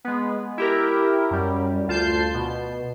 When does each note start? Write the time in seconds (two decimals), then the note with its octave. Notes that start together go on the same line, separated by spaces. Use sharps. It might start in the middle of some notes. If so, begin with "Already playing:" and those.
0.05 G#3 B3
0.58 E4 G4 A#4
1.31 F#2 G3
1.88 D2 F4 A5 G6 C7
2.34 B2